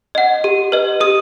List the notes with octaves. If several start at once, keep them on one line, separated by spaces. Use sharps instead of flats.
D#5 F#5
G4
B4 D#5
G4 D#6